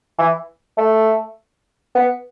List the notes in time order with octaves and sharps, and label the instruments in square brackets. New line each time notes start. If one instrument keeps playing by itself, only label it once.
[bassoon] E3
A3
B3